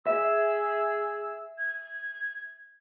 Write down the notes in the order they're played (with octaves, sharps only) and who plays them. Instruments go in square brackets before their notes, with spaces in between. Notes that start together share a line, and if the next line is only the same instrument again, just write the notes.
[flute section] G#4 E6 [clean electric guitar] E5
[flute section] G#6